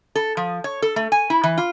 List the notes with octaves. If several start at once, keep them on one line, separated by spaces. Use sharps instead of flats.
A4
F3
C#5
A4
A3
G#5
E4
E3
F4